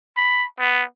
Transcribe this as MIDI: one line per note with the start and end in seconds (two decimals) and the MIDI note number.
0.17 0.45 83
0.59 0.83 59